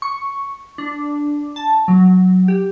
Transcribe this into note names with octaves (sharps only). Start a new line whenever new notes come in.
C#6
D4
A5
F#3
G4